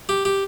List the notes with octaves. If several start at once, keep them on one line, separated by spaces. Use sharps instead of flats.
G4
G4